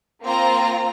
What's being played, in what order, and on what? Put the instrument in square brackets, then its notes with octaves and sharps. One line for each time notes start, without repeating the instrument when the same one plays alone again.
[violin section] A#3 C4 F4 A#5